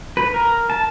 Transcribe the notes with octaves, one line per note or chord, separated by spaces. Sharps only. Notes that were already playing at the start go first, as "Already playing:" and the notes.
B4
A#4
A5